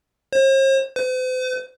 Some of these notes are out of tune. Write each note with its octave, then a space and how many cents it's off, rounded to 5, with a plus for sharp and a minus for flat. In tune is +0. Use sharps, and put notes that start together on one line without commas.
C5 +45
C5 -45